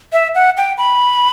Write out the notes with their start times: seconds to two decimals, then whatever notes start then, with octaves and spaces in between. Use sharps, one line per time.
0.13 E5
0.35 F#5
0.57 G5
0.78 B5